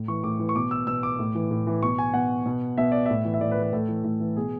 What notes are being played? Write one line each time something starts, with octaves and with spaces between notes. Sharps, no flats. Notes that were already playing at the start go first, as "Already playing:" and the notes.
Already playing: A2
E3 C#6
A2 D6
E3
C#6
B2 D6
E6
B2 E6
D6
A2
E3
A2
E3
B2 C#6
G#5
B2 F#5
B2
B2 E5
D5
A2 E5
E3
E5
A2 D5
B4
E3
B4
A2 A4
E3
A2
E3
B2 G#4